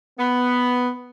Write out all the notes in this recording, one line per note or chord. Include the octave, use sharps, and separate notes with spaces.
B3